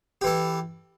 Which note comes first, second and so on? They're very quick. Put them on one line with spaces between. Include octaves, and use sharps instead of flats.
G4 E3 A4